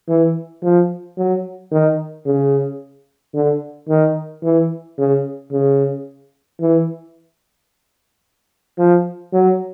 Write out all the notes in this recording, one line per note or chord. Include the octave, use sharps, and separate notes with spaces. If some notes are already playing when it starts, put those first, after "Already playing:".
E3
F3
F#3
D#3
C#3
D3
D#3
E3
C#3
C#3
E3
F3
F#3